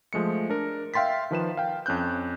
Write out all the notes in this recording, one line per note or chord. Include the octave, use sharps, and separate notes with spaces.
F3 G#3 A3 C#7
D4 A#4
E5 F5 G5 C6 A6 B6
D#3 F3 B4 E7
F5 G5
F2 C#4 F#6 G6